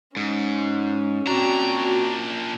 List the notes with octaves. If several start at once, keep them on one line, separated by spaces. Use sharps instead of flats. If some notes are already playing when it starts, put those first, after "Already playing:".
G#2 C#4
A#2 C4 D4 F#4 A#5